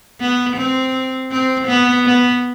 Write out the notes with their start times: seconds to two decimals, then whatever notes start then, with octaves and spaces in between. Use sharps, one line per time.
0.20 B3
0.56 C4
1.31 C4
1.67 B3
2.05 B3